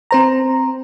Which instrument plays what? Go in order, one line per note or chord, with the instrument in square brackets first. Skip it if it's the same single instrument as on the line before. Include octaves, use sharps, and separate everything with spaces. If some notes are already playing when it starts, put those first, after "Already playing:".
[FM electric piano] C4 C5 A#5